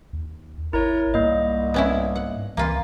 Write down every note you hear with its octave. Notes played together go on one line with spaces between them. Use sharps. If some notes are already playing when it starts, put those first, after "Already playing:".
D#2
G#1 E4 A#4 C#5
C2 G#2 A#3 D#5
B3 C#4 E4
F#5
C#2 E3 A#3 F4